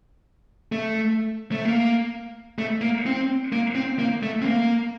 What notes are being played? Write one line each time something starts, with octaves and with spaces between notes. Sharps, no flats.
A3
A3
A#3
A3
A#3
C4
A#3
C4
A#3
A3
C4
A#3